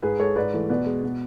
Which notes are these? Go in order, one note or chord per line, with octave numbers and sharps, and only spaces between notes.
G#2 G#4 B4
G#3 A4 C#5
G#2 B4 D5
E3 A3
B2 B4 D5
G#3
B2